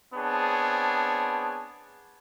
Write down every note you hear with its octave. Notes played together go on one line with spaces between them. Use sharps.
B3 C4 D4 G#4 C#5 A5